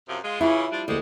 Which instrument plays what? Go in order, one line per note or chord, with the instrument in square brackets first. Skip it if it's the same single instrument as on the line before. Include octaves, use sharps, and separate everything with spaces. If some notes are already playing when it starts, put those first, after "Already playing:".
[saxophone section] F#2 C3 F3
G#3 F4
[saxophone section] C#3 E3 [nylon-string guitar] E4 F4
[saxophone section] F3 G3 D4
[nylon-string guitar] D2 A#3 [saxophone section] G3 G#3